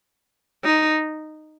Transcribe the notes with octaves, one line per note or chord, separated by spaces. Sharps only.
D#4